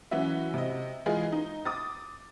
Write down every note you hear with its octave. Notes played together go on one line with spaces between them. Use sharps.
E3 F#3 C#4 F#4 E5
C3 D#5
E3 G#3 F4 G#4
D#4
D6 D#6 A6